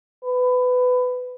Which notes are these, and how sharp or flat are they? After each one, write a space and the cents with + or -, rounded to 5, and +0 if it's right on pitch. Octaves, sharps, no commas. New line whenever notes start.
B4 +20